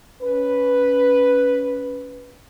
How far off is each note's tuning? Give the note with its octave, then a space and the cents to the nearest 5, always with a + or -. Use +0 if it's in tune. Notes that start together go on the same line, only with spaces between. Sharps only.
C#4 +15 B4 +0